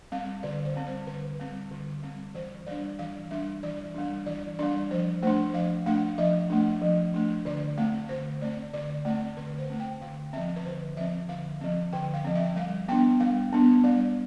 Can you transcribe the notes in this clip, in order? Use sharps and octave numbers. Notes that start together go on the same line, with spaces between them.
G3 C4 F5
D3 D5
C5
G3 C4
C5
D3 B4
G3 C4
D3
G3 C4
E3 C5
G3 D4 D5
E3 F5
G3 D4 E5
E3 D5
G3 D4
E3 D5
G3 D4 D5
F3 C5
A3 D4 C5
F3 F5
A3 D4 F5
F3 E5
A3 D4
F3
A3 D4
D3 D5
A3 C4 F5
D3 C5
A3 C4 D5
D3 D5
A3 D5
C4
D3 B4
C5
A3 C4
G5
D3 F5
F3 C4 E5
B4
D3 C5
F3 C4 E5
D3 F5
F3 C4 E5
D3 G5
F5
F3 C4
E5
G3 F5
B3 D4 G5
G3 F5
B3 D4
G3 D5